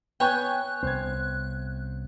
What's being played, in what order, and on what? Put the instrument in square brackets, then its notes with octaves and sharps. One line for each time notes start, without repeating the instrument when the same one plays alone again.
[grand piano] B3 G#5 G6 [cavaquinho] C#5 G5 [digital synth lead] F#6
[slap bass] C2 B3 [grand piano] C5 G#6